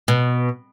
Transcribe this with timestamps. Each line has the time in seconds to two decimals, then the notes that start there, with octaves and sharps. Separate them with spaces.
0.08 B2